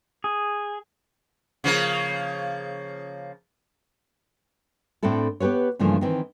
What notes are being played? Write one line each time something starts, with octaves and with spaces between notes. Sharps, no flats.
G#4
C#3 F3 A#3
A2 C4 D4 E4 A4
B3 G4 G#4 B4 C#5
G2 C#3 E3 F3 A3 A#3
D#3 E3 C4